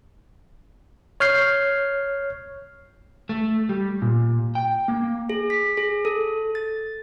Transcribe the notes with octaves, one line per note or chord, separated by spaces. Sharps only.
C#5 F6 G6 C7
A3
G3
A#2
G5
A#3
G#4
B6
G#4
A4
A6